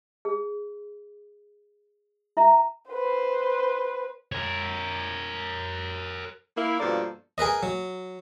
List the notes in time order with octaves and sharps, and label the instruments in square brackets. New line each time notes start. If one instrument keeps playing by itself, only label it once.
[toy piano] G#4
E4 E5 A#5
[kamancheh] B4 C5
[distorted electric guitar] A#4 C#5
[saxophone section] A#3 E4
G2 B2 F3 A#3 A4 D5
[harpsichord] G#4 A#4 B4 D#5
F#3